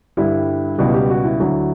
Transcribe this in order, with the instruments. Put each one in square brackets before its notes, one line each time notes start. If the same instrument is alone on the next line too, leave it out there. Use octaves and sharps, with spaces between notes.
[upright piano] G2 D3 G3 E4
C#2 B2 G3 E4
G4
F#4
E4
D2 D3 F#3